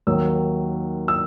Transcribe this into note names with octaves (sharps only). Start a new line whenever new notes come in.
D#2 D#3 F#3 E6
E6